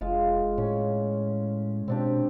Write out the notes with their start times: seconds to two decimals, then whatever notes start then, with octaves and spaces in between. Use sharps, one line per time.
0.01 F1 G#3 F4
0.58 A2 C#4
1.88 B2 C4 D4 G4